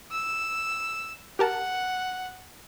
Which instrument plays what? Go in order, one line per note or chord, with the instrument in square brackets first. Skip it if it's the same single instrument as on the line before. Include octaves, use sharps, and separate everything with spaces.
[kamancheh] E6
[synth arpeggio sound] G4 A#4 A5 [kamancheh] F#5